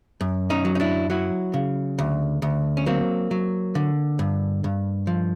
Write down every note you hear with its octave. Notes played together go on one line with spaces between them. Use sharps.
F#2
C#4 D#4
F#3
D#4
D4 E4
F#3 E4 F#4
C#3
D2
D2
C#4
F#3 A#3 C4
F#3
D3
G2
G2
F3